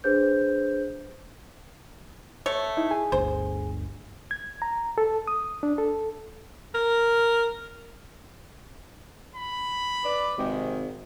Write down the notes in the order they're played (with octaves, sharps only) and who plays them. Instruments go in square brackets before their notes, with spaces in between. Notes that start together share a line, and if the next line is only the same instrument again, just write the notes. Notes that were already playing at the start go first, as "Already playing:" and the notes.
[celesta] D4 G#4 B4 C5 G6
[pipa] A3 C#5
[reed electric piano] D#4 E4
G#4 G#5
[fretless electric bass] G1 D2 [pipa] C5
[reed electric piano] G#6
A#5
A4
D#6
D4
A4
[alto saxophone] A#4
[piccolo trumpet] B5
[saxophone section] B4 D5
[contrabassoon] G#1 [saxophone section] C3 D#3 G#3